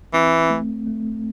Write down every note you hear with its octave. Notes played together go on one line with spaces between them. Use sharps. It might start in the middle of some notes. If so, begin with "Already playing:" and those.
E3 C4
A3
A3